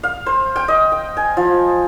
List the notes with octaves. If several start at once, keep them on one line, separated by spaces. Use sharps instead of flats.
F5
C5
G5
D#5
G5
G#5
F3